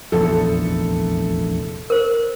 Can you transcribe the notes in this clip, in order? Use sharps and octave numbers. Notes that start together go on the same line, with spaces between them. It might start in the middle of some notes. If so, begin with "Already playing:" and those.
F1 A#1 E2 A4
A#4 C5